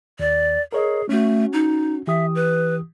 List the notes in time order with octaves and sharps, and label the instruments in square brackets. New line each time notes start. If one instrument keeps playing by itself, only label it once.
[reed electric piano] D#2 [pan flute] D5
[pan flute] G#4 [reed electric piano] A#4 C#5 D#5
[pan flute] A3 [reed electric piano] C#4 F#4
[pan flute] D#4
[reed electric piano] E3 G4 D#6 [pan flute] E5
[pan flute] B4